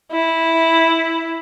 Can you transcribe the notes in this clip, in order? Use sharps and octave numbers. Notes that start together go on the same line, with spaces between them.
E4